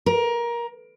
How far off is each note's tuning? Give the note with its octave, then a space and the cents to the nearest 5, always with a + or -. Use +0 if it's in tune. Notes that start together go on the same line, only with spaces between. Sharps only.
A#4 +20